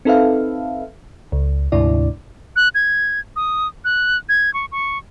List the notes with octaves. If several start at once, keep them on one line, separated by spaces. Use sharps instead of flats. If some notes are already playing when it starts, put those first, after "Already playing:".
C4 D#4 A4 B4 E5 F5
C#2
D2 G#2 C3 D4 E4 D5
F#6
G#6
D#6
F#6
G#6
C#6
C#6